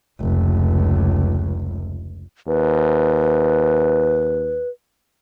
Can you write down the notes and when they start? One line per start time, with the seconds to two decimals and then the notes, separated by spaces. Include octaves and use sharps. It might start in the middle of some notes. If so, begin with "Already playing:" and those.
0.20 F1 C#2
2.48 D#2 B4